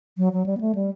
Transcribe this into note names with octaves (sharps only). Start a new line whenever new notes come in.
F#3
F#3
G3
B3
A3
G3